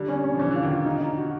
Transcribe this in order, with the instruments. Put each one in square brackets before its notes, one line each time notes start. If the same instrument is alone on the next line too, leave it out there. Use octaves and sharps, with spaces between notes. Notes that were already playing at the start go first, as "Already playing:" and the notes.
Already playing: [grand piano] D3 [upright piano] G3
[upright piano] C#4
C#4
[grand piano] F3
[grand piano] E3 [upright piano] C#4
[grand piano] D3 [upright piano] F4
[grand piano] D#3
[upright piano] F4
D#4
D#4
F#4